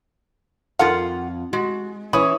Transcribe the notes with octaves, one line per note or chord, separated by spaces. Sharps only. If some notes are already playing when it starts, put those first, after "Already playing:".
F2 D#3 F4 A4 F5 F#5
G#3 F#4
E3 C#4 C#5 B5 D#6